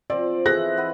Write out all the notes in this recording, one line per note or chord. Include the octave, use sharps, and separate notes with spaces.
F3 C4 D5
E3 G#4 A4 D#5 F#6 A#6
B4 F#5